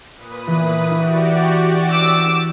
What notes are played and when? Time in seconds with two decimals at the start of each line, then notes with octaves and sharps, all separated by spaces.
0.14 A#2 B4 D#6
0.47 E3 B3
0.91 E4 F#4 G4 D5
1.90 D6 E6